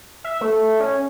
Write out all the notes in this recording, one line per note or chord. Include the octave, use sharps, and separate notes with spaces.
E5
A3
C#4